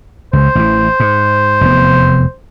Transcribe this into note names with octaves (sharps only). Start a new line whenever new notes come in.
C#2 C5
A1 E3
G#2
F1 E2 B3